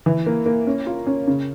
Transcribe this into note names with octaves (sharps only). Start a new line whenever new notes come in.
E3
A#3
A#3
C#4
F4
C#4
C#3